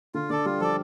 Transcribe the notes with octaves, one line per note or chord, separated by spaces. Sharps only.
D3 F4
D3 A4 D5
G3 F4
F3 A4 D5